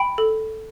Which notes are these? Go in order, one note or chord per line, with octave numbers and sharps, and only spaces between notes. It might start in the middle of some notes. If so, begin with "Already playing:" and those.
Already playing: G5 B5
A4